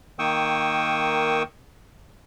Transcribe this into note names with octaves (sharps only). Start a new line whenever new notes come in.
D#3 A#3 G5 C#6 D#6 E6